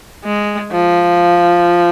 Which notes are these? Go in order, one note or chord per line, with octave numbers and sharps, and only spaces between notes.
G#3
F3